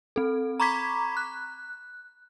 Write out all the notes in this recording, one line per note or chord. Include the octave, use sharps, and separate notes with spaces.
C4 A4
A#5 B5 C#6 D6 G#6 B6
F#6